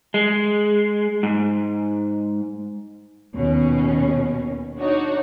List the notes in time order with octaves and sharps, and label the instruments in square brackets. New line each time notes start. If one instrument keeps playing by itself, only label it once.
[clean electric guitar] G#3
G#2
[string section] D#2 B2 C#4
D4 D#4 F#4 C#5